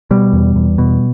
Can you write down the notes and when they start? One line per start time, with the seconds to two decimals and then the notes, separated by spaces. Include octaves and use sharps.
0.11 B2 G3
0.33 E2
0.55 E2
0.78 B2